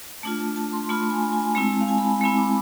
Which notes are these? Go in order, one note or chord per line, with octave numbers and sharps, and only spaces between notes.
A3 D4 F4 A5
A5
A5
C6
A3 D4 F4 B5
G#5
G#5
G#3 C4 E4 A5
A5
F5
G#5
B5
A5
G#3 C4 E4 B5
D6